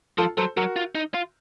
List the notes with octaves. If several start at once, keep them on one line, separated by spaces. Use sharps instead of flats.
F3 F4 A4
F#3 A4 C5
F#3 F#4 A#4
F4
D#4
F4